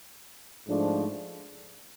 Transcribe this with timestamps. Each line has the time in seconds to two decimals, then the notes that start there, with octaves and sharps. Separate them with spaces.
0.66 G#2 F3 A3 D4